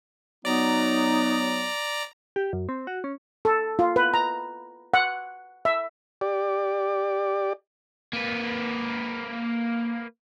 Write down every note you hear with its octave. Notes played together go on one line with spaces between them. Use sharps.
F#3 B3 D#4 D5 A#5
G4
F#2
C4
F#4
C#4
A4
F4
B4
A#5
F#5
E5
G4 D5
A#3 B4